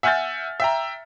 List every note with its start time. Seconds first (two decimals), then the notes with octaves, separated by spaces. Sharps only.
0.03 E5 F#5 G#5 F6 G6 A6
0.60 E5 G5 A#5